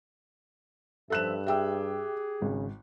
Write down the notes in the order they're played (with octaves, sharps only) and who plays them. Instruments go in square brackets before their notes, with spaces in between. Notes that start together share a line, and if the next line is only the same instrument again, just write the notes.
[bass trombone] G2 [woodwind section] F3 E5 [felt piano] A4 F#6 E7
[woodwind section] G4 G#4 [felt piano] E5 G5 E6
[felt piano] G#1 [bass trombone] C#3